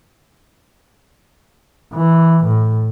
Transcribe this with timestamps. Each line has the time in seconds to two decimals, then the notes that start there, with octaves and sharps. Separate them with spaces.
1.94 E3
2.44 A2